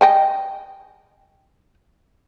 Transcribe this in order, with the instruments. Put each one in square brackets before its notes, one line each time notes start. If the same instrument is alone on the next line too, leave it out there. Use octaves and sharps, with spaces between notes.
[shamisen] D#5 G5 G#5